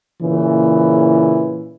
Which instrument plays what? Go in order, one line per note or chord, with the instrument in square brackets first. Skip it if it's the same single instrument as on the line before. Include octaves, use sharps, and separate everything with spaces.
[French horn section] A#2 C#3 E3